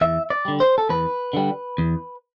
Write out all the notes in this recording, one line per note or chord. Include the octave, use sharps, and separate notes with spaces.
E2 E5
D5
D3 G3
C5
A4
E2 B4
D3 G3
E2